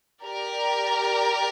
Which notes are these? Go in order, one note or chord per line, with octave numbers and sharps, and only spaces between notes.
G4 A#4 D5